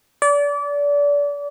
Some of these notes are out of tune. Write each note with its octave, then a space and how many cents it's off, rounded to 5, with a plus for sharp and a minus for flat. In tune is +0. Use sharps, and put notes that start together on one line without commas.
D5 -30